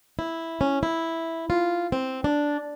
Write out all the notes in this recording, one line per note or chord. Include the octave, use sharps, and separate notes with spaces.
E4
C#4
E4
F4
C4
D4